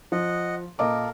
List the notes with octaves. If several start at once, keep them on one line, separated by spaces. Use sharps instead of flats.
F3 D#5 F#5
A#2 A#3 A4 A#4 D#5 D6